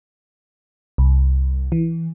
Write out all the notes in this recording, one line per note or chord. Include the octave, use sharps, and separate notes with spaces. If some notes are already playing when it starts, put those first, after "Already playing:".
C2
E3